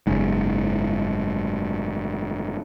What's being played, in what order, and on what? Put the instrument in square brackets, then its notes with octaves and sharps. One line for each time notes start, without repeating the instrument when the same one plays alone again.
[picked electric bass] F#1 G#2